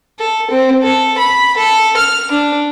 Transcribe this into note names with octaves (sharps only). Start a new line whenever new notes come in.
A4
C4
A4
B5
A4
F6
D4